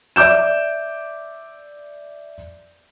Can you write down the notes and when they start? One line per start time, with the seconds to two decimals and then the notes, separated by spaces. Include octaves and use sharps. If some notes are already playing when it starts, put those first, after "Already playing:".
0.16 D5 E5 D6 G6 E7